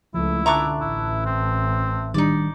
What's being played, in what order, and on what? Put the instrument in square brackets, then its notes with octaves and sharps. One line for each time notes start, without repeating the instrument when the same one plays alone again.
[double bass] C#2 A3 [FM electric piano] F3 [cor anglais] E4
[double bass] D3 [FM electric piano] E5 A5 F#6 [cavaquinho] A#5 C#6 D6
[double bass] A1 [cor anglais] E4
[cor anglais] C4
[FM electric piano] D#3 G3 D4 [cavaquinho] D#4 D5